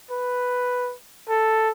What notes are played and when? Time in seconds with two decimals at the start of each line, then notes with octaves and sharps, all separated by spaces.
0.11 B4
1.29 A4